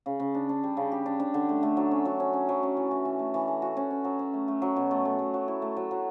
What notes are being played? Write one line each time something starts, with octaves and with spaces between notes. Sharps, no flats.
C#3
C#3
D4
D4
G3
C#3
G4
D4
D4
D3
A3
A3
F#3
C#4
F#3
C#4
C#4
F#3
C#4
E3
E3
E3
A3
E3
A3
F#4
C#4
C#4
F#3
C#4
A3
A3
F#3
B2
A3
A3
A3
F#3
E4
A3
F#3
F#3